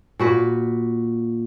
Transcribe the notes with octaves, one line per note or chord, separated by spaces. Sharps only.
A#2 F#4 B4